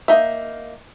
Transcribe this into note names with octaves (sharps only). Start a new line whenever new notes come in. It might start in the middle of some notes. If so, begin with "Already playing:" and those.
A#3 D#4 E5